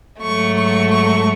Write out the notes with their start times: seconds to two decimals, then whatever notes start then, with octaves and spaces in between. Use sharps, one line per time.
0.21 G#2 F#3 A3 C#6
0.55 C#6
0.90 C#6